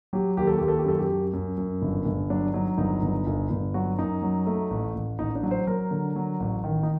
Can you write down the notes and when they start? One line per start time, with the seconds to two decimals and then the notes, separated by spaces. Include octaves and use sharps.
0.13 F#3 G4
0.37 D#2 G4
0.47 A4
0.58 D#2 G4
0.68 A4
0.79 G4
0.85 F#2 A4
0.99 G4
1.10 F#2
1.33 F#2
1.57 F#2
1.82 G1
2.05 G1
2.30 F#3 D4
2.54 F#3 D#4
2.78 G1 D#4
3.02 G1
3.27 G1
3.50 G1
3.74 F#3 F#4
3.98 F#2 D#4
4.22 F#3
4.47 A3
4.70 A1
4.95 A1
5.19 A1 D#4
5.35 D4
5.43 F#3
5.51 C5
5.67 F#3 A#4
5.91 D3
6.16 F#3
6.40 A1
6.64 D#3
6.83 D#4